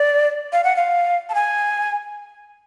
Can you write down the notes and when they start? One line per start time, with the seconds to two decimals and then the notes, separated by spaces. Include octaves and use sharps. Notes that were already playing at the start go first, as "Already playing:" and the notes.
Already playing: D5
0.53 F5
0.64 F#5
0.76 F5
1.29 A5
1.35 G#5